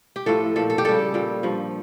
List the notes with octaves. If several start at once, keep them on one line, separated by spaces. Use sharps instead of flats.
G4
A2 F3 A4
A#2 F3 A4
A4
G4
C#3 G3 A4
A#2 G3
G2 F3